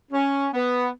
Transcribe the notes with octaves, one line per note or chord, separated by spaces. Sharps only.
C#4
B3